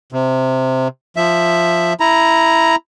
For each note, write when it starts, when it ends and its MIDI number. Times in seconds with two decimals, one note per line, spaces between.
0.12 0.88 48
1.16 1.93 53
1.16 1.93 76
2.00 2.76 64
2.00 2.76 82